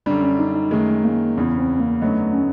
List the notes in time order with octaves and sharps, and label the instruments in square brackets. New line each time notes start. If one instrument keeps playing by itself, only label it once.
[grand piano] F#2 D3 G3 [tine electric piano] D4
[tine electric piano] C#4
D#4
D#4
[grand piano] F#2 D#3 G#3 [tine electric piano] A3
[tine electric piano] A#3
[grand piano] E2 C#3 E3 [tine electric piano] B3
[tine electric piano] C4
A#3
[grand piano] F#2 D3 F#3 B3 D#4 [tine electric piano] A3
[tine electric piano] C#4